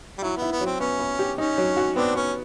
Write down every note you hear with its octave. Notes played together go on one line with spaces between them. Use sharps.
G3
F#3 E4
B3 E4
B3
F#3
C4
B3 C#4
B3
G4
C#4 D#4
F#3
F#4
B3 C4 D4
B3 C#4